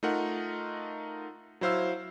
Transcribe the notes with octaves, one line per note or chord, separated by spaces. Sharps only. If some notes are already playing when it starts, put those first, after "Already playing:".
A3 D#4 F4 A#4 F#5
F#3 E4 C5 F5 E6